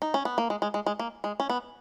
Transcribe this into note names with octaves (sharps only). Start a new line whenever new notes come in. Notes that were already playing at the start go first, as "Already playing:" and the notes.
D#4
C#4
B3
A#3
G#3
G#3
G#3
G#3
A#3
G#3
C#4
B3